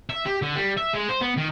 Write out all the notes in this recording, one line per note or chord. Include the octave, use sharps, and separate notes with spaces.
E5
G4
D3
G3
E5
G#3
C5
B3
D#3